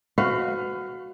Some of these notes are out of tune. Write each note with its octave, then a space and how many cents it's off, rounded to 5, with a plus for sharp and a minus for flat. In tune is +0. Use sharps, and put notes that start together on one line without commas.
F#4 +0 B4 +35 F5 +0